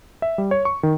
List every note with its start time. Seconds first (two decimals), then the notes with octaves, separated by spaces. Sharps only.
0.22 E5
0.38 G3
0.51 C#5
0.65 C#6
0.83 D#3